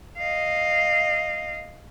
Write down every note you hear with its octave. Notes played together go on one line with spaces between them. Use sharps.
D#5 F5